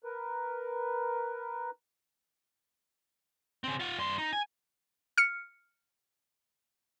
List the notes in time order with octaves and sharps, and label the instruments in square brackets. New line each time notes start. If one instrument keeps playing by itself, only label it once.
[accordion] A#4 B4
[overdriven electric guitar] C#3 C4
F4 F#5
G2 C6
D#4
G#5
[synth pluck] F6 C#7